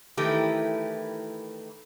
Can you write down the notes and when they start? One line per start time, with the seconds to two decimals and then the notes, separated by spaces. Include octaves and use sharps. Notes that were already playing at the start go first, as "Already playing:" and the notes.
0.17 D#3 E3 A3 E4 G4